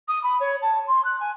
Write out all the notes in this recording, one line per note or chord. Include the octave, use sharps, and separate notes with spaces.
D#6
B5
C#5
A5
C6
F#6
G#5